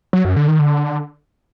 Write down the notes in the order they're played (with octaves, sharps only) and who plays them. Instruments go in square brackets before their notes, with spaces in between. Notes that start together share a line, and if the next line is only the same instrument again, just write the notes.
[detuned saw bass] F#3
F#2
D3
D#3
D3